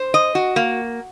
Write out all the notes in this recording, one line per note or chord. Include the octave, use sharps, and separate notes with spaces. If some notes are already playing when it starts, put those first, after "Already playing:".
Already playing: C5
D#5
F#4
A#3